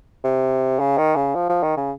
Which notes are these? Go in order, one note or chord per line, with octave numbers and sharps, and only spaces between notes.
C3
C#3
D#3
C#3
F3
F3
D#3
C#3